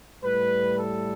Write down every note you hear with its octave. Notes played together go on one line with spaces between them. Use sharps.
A2 G3 B4
A4